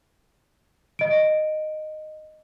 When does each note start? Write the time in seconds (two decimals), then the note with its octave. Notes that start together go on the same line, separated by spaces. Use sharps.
0.99 D#5 D7